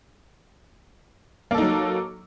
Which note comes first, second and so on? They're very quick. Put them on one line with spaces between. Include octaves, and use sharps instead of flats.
A#3 A4 D#4 F#3